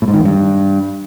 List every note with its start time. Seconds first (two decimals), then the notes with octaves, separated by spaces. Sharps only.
0.02 A2
0.08 G#2
0.14 D#3
0.19 E2
0.25 G2